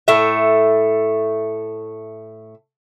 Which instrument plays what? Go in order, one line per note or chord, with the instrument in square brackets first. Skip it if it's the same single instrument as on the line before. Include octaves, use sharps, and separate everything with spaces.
[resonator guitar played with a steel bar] A2 A3 E5